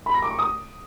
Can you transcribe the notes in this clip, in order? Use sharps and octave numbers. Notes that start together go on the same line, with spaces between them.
B5
A#6
D6
C#6
D#6